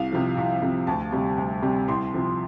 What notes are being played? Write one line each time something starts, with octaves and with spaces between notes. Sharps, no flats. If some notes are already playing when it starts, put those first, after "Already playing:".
Already playing: C2 F5
C3 F3
C2
C3 F3
D2 A5
C3 G3
D2
C3 G3
C2 C6
C3 F3